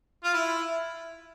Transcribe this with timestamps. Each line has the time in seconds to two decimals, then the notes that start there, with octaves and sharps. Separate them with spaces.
0.24 F4
0.34 E4